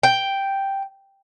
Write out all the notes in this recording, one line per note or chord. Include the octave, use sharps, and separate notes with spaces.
G5